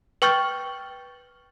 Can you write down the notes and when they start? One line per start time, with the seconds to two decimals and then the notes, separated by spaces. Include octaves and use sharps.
0.22 B4 G5 C#6 F6 G6 A6